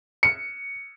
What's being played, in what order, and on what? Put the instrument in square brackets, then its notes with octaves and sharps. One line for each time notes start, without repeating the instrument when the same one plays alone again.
[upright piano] C#7